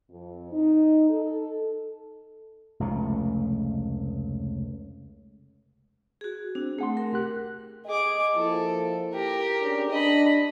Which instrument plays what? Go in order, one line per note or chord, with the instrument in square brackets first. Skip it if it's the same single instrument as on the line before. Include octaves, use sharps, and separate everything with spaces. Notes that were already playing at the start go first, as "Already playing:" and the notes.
[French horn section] F2
D#4
A4
[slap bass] F1 C#2 C#3 A3
[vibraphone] F#4 G#4
[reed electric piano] C4 [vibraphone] D4
[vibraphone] A3 [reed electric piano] G#4 F#5 C6
[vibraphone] A#4
[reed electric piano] C2 G4 F#6
[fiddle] G#4 D6 [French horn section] D#5
[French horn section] F3 A#3 E4 [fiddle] A4
[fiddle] G4 A#4
[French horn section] C#4 D4 G#4
[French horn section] D4 [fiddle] D#5 B5